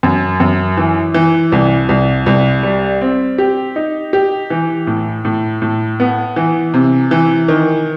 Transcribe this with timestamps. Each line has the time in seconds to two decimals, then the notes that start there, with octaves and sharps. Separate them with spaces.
0.03 F#2
0.40 F#2
0.77 E3
1.14 E3
1.52 C2
1.89 C2
2.26 C2
2.63 G3
3.01 C4
3.38 G4
3.76 D#4
4.13 G4
4.50 E3
4.87 A2
5.25 A2
5.62 A2
6.00 B3
6.36 E3
6.74 C3
7.11 E3
7.48 D#3